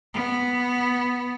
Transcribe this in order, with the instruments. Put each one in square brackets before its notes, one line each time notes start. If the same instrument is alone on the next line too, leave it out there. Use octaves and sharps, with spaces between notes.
[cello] B3